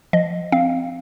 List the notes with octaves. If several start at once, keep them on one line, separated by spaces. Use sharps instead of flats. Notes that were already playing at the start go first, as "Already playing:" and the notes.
F3 D#5
C4 F5